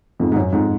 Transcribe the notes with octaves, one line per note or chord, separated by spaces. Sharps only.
F2 G#2
G#2
F#2
F2 G#2